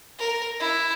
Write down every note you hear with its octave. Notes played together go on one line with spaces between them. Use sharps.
A#4
E4